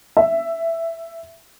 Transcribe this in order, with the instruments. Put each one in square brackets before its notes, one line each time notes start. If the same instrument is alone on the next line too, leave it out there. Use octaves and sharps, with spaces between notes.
[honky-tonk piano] E5